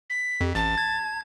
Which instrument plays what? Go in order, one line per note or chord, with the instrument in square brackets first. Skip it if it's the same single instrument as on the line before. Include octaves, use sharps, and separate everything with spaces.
[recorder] B6
[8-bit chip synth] F2 [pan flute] G4
[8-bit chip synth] A1 [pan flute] A5 [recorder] A6
[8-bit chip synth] G#6